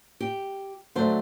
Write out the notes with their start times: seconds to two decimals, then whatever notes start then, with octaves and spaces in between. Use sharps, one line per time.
0.20 G4
0.95 D3 F#3 A3 C5